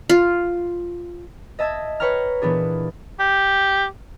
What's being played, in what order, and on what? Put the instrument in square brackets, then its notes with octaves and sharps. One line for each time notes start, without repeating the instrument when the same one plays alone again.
[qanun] F4
[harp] D#5 E5 A5 E6 G#6
B4 C#5 G5 A#5 F6
A#2 E3 B3 D4 G#4
[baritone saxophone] G4